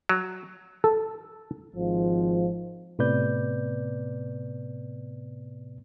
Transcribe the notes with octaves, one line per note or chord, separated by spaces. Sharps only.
F#3
A4
G#1 G#2 F3
A2 C3 B3 B4 D5 G6